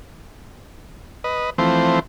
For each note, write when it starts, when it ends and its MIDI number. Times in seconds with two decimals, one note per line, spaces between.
1.24 1.50 71
1.24 1.50 75
1.58 1.99 52
1.58 1.99 53
1.58 1.99 57
1.58 1.99 60
1.58 1.99 72